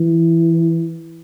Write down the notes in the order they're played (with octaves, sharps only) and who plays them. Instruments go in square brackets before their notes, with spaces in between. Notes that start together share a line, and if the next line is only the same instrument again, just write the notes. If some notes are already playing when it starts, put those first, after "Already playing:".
Already playing: [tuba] E3